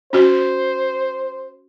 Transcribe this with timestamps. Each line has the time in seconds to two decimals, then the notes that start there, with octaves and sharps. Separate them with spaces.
0.13 C#4 F#4 C5